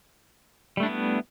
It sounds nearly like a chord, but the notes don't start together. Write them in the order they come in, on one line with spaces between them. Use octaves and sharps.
G3 A3 D4 E4 B3